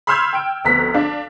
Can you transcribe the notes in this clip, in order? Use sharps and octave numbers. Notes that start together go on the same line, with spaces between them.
B5 C6 E6 F6 G6 G#6
G5 D7
F1 D2 B3 A#5 F#6 B6
D4 F5